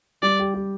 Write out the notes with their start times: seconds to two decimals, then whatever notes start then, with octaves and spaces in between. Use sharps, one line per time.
0.23 G3 D5
0.39 G4
0.54 G4